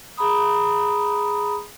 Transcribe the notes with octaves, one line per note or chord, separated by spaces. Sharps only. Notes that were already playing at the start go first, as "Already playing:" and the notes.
G#4 A#5 B5 D#6